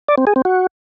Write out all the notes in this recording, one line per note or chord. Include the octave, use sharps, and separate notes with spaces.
D5
C4
G#4
C4
F#4